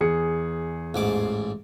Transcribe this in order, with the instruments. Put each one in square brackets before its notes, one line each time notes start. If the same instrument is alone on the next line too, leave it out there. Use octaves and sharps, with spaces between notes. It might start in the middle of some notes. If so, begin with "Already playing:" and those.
[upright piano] E2 G#4 C#7
[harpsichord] A1 G#2 D6